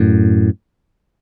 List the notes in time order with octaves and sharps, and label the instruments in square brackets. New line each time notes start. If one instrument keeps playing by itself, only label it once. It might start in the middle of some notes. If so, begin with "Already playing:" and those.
Already playing: [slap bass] F#2 A2